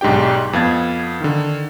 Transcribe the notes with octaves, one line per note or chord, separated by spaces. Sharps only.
B1 G#2 D4 G4 G5
F2 B3 F5 G#6 A6
D3 D#3